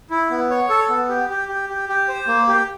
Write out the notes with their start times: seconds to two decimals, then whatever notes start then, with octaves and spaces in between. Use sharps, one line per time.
0.11 E4
0.30 B3
0.50 C#5
0.70 A4
0.89 B3
1.09 G4
1.30 G4
1.48 G4
1.69 G4
1.89 G4
2.09 C5
2.27 A#3
2.48 G4